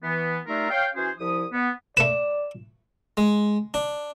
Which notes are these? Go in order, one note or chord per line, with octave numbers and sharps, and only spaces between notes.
E3 B3
G3 A3 D#4 F4 A#4 E5
C#5 F5 G5
E3 C#4 F#4 G#4 C5
C2 F3 E4 D#6
B3
A3 B4 D5 E7
G#3
D4